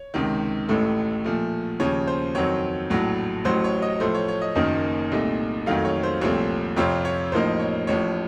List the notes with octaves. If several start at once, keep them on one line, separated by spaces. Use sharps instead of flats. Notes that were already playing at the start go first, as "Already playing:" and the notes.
Already playing: C#5
C#2 C3 D#3
A1 A2 A3
A#2 F3 A3
D#2 C#3 F3 C#5
C5
F2 D#3 F#3 C4 C#5
A#1 A2 F#3
A1 A2 F#3 C5
C#5
D#5
A2 F3 A3 C5
C#5
C#5
D#5
F#1 F#2 D#3 A#3 D#4
C2 A#2 A3 D#4
F2 D#3 F#3 A3 F5
C#5
C5
C2 A#2 F3 A3 C4 C#5
F2 C3 F3 C4 F4 C#5
C#5
A1 A2 F3 A#3 D#4 C5
C#5
A1 A2 F3 C#5